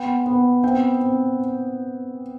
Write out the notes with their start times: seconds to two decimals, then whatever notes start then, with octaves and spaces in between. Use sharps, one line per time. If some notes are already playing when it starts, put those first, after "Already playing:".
Already playing: B3 G5
0.26 B3
0.63 C4 G5
1.00 C4